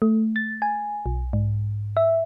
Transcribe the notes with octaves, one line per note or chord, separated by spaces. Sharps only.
A3
A6
G#5
B1
G#2
E5